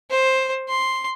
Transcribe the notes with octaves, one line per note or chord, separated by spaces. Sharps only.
C5
C6